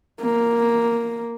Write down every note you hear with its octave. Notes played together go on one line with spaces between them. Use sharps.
A#3